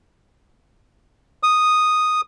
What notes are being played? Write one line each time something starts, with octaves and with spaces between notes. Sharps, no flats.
D#6